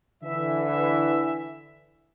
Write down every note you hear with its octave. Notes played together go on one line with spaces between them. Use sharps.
D3 E3 E5